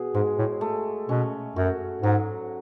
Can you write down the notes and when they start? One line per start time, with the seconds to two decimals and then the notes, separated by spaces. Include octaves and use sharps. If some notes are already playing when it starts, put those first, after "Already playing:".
Already playing: B2 G#4
0.14 G#2 G#3
0.39 A2
0.61 A3
1.09 B2 C#4
1.56 F#2 F#4
2.02 G#2 F#3